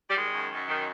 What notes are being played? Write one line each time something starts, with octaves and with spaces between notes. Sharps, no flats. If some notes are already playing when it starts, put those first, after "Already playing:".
G3
D#3 G#3
F#2
F#2
D#3